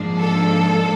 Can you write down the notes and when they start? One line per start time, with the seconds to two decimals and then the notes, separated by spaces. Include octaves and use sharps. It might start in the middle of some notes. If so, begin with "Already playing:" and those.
Already playing: G#2 F3 A#3 D4
0.19 A4